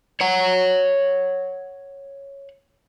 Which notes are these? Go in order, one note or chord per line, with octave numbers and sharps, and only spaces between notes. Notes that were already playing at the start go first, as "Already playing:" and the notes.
C#5 F#5